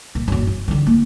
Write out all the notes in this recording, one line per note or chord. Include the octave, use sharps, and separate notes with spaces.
A#2
F#2 A#2
F#3
D3 D#3
A#3 F4